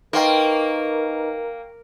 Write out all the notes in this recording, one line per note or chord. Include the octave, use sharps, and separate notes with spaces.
A#3 D#4 A#4 B4 D#5 G5 C6 C#6